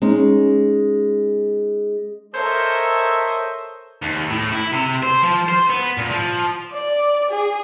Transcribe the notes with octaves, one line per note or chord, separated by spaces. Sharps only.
G#3 C#4 D#4
A4 A#4 C5 C#5 D#5 E5
D#2
A2
E4
C3
C5
F3
C5
B3
A#2
F3
D5
G#4